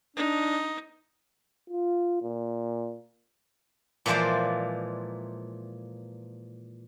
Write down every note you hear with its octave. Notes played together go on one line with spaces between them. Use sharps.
D4 D#4
F4
A#2
A#2 E3 F3 G#3 C5 D5